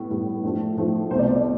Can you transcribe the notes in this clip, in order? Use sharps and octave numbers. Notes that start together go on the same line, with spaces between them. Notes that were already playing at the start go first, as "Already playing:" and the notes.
Already playing: A2 G3 B3
A2 G3
A2 F3 A3 D4
A2 F3 A3
C2 B2 A3 C5
D5
C5
D5